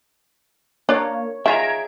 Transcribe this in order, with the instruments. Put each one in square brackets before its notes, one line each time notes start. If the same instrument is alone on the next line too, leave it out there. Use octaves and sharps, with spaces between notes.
[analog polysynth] A#3 [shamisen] D4 D5 [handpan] C#5
[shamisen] D#3 F4 [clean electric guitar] G#4 E5 [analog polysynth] A#5 G#6 D7